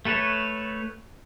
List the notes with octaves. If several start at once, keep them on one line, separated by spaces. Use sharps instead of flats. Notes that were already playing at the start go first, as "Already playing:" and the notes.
A3 A4 B4 C#5